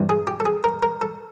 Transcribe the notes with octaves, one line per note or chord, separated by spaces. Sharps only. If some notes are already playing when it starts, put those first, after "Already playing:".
Already playing: G2 E3 G3 C4
G#4
G4
A4
G#4
A#4
A#4
A4